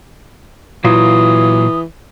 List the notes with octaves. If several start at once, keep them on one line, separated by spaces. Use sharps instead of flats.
A#2 E3 F#3 F4 D#6